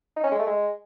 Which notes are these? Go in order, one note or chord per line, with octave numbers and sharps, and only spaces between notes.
D#4
C#4
G#3
A3
G#3